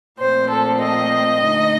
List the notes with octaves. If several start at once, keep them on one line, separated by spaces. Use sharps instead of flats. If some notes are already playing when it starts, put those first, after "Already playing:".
A#2 F3 A3 C4 C5
A4
D#5
D3 A3 D#4